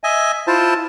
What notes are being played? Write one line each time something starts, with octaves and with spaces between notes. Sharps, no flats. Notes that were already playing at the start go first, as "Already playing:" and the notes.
D#5 E5 G#5
E4 F4 C5 A5